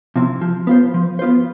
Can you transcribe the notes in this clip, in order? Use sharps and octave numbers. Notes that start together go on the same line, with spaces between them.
C3 F3 C4 E4
F3
B3 F4 C5
F3
B3 F4 C5